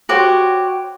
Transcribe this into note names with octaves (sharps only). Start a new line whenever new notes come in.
F#4 G4 C5 C#5